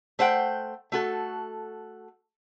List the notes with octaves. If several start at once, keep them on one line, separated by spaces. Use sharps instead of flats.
A3 C5 F#5 G5
A3 F#4 A4